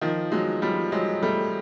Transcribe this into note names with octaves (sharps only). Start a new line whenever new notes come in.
D#3 F3
F#3 G#3
F3 G3
F#3 G#3
G3 A3